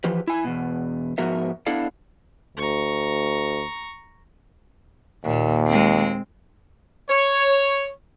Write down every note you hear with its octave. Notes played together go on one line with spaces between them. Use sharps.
E3 F3 G4 B4
E4 G#5
E2 B2
G#2 F3 B3 F#4 A#4 E5
B3 D4 E4 A4 F5
D2 A#5 C#6
D#2 A#2
G#3 C4
C#5